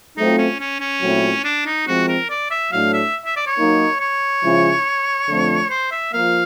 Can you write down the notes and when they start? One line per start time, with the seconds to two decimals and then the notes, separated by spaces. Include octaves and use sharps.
0.16 F#3 A3 C4 D#4 F4
0.38 C#4
0.59 C#4
0.80 C#4
1.01 A#2 F#3 A3 C4 E4
1.44 D4
1.65 D#4
1.87 F3 G#3 C4 F#4
2.08 A#4
2.30 D5
2.51 E5
2.72 A2 F#3 A3 D4 F5
2.93 E5
3.25 E5
3.36 D5
3.46 C#5
3.57 F#3 A#3 D#4
4.00 C#5
4.42 C#3 F3 G#3 C#4 E4
5.28 F2 D3 F3 A3 C4
5.70 C5
5.91 E5
6.13 F3 A#3 F5